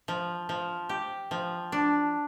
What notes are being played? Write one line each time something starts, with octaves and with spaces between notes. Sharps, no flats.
F3
F3
G4
F3
D4